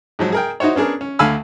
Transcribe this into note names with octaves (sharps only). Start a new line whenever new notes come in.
G#2 F3 F#3
G#4 A#4 G5
D#4 E4 F#4 C5 C#5
B3 C#4 D4 G#4 A#4
C#4
D2 D3 F5 G#5 B5 E6